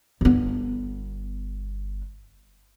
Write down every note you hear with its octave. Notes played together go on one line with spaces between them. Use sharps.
G1 B3